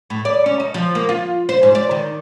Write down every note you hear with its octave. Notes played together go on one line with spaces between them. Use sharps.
A2
D5
C#4
D#4
F3
A#3
F4
C5
G#2
D5
D#3